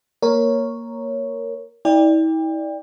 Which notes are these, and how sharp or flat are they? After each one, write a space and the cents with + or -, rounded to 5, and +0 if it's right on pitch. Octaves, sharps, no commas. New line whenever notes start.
A#3 +0 A#4 +0 C#5 +0
E4 -45 D5 +0 G5 +30